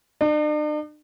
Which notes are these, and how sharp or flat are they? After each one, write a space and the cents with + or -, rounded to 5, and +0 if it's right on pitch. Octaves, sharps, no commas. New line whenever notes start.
D4 +45